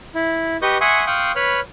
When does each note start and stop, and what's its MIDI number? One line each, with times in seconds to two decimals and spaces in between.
0.15 0.57 64
0.62 0.78 67
0.62 0.78 71
0.62 0.78 75
0.62 0.78 85
0.62 0.78 87
0.62 0.78 91
0.81 1.05 76
0.81 1.05 78
0.81 1.05 80
0.81 1.05 84
0.81 1.05 85
0.81 1.05 87
1.07 1.32 77
1.07 1.32 79
1.07 1.32 84
1.07 1.32 85
1.07 1.32 87
1.07 1.32 90
1.36 1.60 71
1.36 1.60 73
1.36 1.60 83
1.36 1.60 89